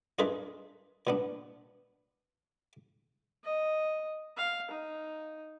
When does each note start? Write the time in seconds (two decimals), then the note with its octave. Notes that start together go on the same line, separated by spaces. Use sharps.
0.19 D4 D#4 F4 G#4 A#4 B4
1.07 A#2 B3 D4
3.44 D#5
4.37 F5
4.71 D#4